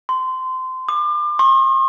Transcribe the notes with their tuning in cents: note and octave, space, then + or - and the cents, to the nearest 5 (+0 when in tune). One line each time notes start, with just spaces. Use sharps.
C6 -20
D6 +35
C6 +45